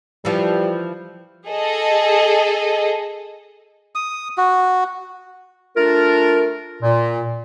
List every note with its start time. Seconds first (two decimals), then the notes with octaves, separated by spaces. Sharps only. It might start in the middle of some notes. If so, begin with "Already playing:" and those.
0.25 E3 F3 G3
1.48 G#4 A4 D#5
3.95 D#6
4.38 F#4
5.77 A3 D4 F4 A#4
6.83 A#2